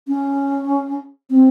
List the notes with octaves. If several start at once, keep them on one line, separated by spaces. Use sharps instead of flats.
C#4
C4